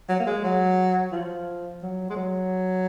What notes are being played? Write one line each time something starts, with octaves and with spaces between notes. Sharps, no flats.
F#3
A#3
G#3
F#3
F3
F#3
G#3
F#3